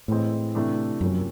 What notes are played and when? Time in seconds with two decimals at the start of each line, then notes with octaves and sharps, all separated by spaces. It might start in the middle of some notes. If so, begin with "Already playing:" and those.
0.08 A2 E3 G#3 C4
0.55 C3 E3 A3 D4
1.01 F#2 C3 F3 A#3 C#4